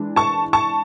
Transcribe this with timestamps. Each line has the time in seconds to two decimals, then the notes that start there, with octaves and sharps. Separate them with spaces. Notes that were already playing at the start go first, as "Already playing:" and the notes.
Already playing: E3 G#3 D4
0.16 A5 C#6
0.53 A5 C#6